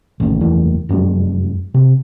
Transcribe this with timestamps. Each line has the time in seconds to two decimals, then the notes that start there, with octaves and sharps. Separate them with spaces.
0.20 A1 D#2 A2
0.41 F#1 E2 E3 A3
0.89 F1 F#2 G#3 D4
1.74 C3